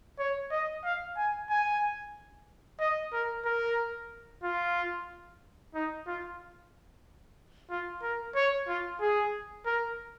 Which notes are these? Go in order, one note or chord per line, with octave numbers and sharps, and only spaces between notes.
C#5
D#5
F5
G#5
G#5
D#5
A#4
A#4
F4
D#4
F4
F4
A#4
C#5
F4
G#4
A#4